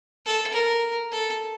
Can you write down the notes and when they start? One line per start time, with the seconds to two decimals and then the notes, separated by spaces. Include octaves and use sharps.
0.26 A4
0.53 A#4
1.12 A4